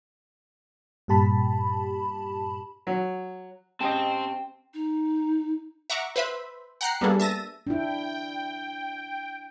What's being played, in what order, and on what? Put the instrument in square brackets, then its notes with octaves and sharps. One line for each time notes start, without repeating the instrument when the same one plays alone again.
[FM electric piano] G2 A#2 G4 A5 B5
[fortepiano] F#3
[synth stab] G#3 D#5 [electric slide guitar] C4 C5 [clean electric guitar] C#4 G4 A5 [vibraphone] G5
[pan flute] D#4
[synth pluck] E5 F#5 A#5 C#6 D6
B4 C5 E5 B5
F#5 G5 A#5 F#6 C7 C#7
G3 A#3 B3 D4 G#4 A4
E5 A5 A#6 D#7
[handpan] D4 E4 [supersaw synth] G5